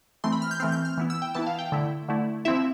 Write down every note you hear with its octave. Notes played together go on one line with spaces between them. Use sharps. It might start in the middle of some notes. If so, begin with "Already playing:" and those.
E3 A3 C4 C6
B5
F6
G6
E3 A3 C4 F6
G6
F6
E3 B3 E4
E6
G5
E3 B3 E4 A5
F5
G5
D3 A3 E4
D3 A3 E4
F3 C4 E4 E5